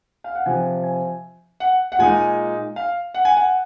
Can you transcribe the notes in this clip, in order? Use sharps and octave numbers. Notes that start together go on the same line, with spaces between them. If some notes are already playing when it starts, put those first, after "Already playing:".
F5
F#5
C3 F3 C4 G#5
G#5
F#5
F#5
A#2 G#3 D#4 G#5
F5
F#5
G#5
F#5